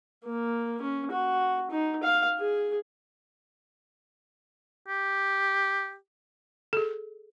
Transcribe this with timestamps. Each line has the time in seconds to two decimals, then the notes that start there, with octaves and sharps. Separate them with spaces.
0.25 A#3
0.81 C#4
1.11 F#4
1.71 D#4
2.03 F5
2.39 G#4
4.88 G4
6.73 G#4 A4